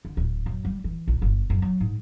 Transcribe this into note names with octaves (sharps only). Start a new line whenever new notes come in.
D3
D1
F#2
G3
E3
A#1
G1
F#2
F#3
G#2